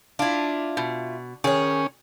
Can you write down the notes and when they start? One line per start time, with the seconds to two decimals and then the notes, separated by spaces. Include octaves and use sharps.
0.19 D4 E4 F4
0.77 B2
1.44 D#3 C#4 G#4 C#5